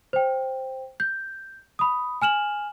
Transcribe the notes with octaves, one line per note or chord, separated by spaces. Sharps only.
C5 G5
G6
B5 D#6
G#5 F6 E7 F#7